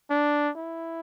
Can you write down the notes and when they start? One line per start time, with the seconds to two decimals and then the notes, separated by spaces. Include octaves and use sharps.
0.10 D4
0.56 E4